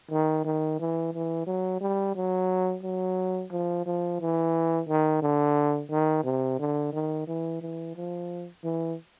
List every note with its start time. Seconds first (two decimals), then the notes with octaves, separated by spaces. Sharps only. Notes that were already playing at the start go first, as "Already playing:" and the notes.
0.11 D#3
0.45 D#3
0.80 E3
1.14 E3
1.47 F#3
1.81 G3
2.16 F#3
2.83 F#3
3.51 F3
3.86 F3
4.21 E3
4.89 D#3
5.22 D3
5.91 D#3
6.24 C3
6.59 D3
6.93 D#3
7.28 E3
7.62 E3
7.96 F3
8.64 E3